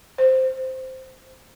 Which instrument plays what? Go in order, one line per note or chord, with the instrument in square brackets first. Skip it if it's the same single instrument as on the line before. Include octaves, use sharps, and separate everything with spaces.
[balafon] C5